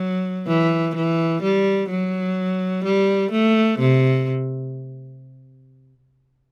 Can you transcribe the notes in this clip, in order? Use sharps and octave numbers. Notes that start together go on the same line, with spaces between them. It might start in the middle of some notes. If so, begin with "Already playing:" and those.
Already playing: F#3
E3
E3
G3
F#3
G3
A3
C3